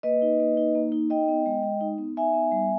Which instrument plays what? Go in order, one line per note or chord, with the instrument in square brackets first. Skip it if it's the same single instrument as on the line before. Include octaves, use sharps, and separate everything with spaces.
[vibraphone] A#3 B4 D#5
D#4
A#3
D#4
A#3
D#4
D#4 D#5 G5
B3
G#3
G#3
D#4
B3
D#4 E5 G#5
B3
G3